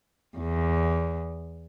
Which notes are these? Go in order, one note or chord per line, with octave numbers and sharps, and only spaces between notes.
E2